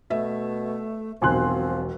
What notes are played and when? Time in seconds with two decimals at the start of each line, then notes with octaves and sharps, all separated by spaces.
0.10 B2 A3 E5
1.22 E1 B1 F3 C4 G#5 C6 F#6